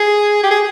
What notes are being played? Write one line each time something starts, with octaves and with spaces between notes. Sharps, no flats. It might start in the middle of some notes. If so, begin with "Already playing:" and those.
Already playing: G#4
G4
G#4